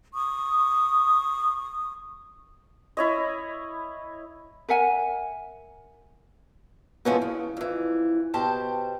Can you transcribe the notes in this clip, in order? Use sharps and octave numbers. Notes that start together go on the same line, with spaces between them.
C#6 D#6
E4 C#5 D#5
A#4 E5 F#5 G#5
B2 E3 F3 G#3 B3 C#4
C#3
F2 E3
B2 G4 C5 A5